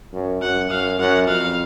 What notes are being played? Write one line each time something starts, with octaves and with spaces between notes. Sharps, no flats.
F#2
F#2 F#5
F#2 F5
F#2 F#5
F2 F5